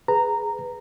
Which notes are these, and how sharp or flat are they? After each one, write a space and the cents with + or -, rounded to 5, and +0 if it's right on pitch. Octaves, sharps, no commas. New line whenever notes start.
G#4 +0 B4 +0 A#5 -10